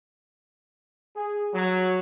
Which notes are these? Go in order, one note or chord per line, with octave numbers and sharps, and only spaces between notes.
G#4
F#3